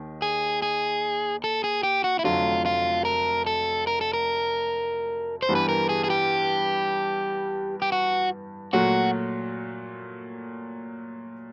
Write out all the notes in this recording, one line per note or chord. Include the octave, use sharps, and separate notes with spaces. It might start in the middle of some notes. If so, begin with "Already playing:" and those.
Already playing: D#2 D#3
G#4
G#4
A4
G#4
G4
F#4
E4
F1 F2 D3 F#3 A3 F4
F4
A#4
A4
A#4
A4
A#4
C5
G2 E3 G3 B3
B4
A#4
G#4
G#4
G4
G4
F#4
A#2 F#3 A3 F#4